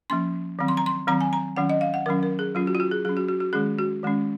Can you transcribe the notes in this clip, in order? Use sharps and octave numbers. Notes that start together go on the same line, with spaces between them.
F3 A#3 C#4 C6
D#3 F#3 C4
C6
A#5
C6
D#3 F#3 C4 A#5
G#5
A#5
D#3 F#3 C#4 F#5
D#5
F5
F#5
D#3 F#3 C#4 A#4
A#4
G#4
F#3 C#4 F4
F#4
F4
F#4
G#4
F#3 C#4 G#4
F#4
F#4
F#4
D#3 G#3 C#4 G#4
F#4
D#3 G#3 C#4